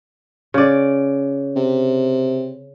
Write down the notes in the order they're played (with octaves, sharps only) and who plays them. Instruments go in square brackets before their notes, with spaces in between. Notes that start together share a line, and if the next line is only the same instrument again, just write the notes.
[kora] C#3 D5
[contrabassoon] C3